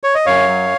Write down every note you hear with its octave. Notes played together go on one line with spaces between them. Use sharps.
C#5
D#5
F#2 C#5 F5
F#3